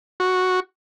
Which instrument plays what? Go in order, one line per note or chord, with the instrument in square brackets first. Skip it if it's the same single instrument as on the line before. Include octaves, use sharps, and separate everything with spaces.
[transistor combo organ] F#4